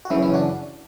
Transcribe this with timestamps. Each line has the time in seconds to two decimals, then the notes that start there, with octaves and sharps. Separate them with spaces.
0.05 F#4
0.10 F#2 C#3 E3 C#4 E4
0.23 C#4 E4
0.34 D4 F#4